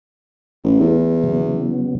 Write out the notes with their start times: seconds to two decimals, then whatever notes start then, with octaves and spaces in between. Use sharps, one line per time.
0.64 A1
0.80 E2
1.24 C#3 F#3 B3